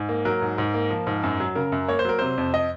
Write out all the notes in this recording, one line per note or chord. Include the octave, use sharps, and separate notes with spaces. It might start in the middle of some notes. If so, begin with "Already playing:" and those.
Already playing: G#2
A#3
F#3 A#4
G#2
G#2
A#3
F3
G#2
F#2
F#3
C#3 A#4
F#2
A#3 C#5
C5
F#3 A#4
C3 C5
F2
D#5